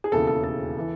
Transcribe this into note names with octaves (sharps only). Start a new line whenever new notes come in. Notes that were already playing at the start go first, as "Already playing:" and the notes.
G#4
E1 D#2 C#3 E3 A4
A4
A4
E3